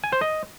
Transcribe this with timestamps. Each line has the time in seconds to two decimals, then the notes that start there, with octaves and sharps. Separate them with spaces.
0.04 G#5
0.13 C5
0.21 D#5